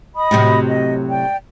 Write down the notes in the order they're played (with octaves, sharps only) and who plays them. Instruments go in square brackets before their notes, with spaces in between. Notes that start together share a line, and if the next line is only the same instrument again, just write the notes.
[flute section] D#5 B5 D#6
[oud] A2 C3 F#3
[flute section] D#5
D5 G5